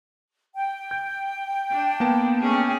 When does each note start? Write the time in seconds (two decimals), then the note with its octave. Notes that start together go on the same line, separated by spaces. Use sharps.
0.55 G5
0.91 G6
1.71 D4
2.00 A#3 B3 A5
2.40 A3 C#4 G#4